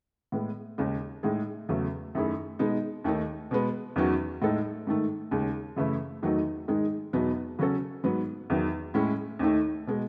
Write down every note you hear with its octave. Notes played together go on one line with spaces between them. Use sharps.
A2 G#3 B3
D#2 C#3 G#3 D#4
A2 G#3 D#4 G#4
E2 C#3 F#3 A3
F#2 D#3 A3 E4 G#4
B2 G#3 B3 D#4
D#2 D#3 A3 D#4
B2 G#3 B3
E2 D#3 F#3 C#4 F#4
A2 G#3 D#4 A4
G#2 D#3 A3
D#2 C#3 G#3
F#2 C#3 E3 A3 E4
E2 D#3 F#3 A3 D#4
G#2 D#3 G#3 D#4 G#4
E2 B2 F#3 B3 D#4
C#3 F#3 C#4 F#4 A4
G#2 F#3 B3
E2 D#3 F#3
A2 G#3 C#4 E4
D#2 D#3 A3 D#4
B2 G#3